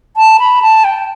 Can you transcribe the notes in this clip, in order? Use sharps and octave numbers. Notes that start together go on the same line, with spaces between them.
A5
B5
A5
G5